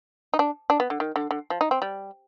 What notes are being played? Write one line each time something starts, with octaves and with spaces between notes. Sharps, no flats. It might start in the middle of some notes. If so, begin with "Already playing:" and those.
D#4
D4
D4
B3
D3
D#3
D3
D3
F3
D#4
C4
G3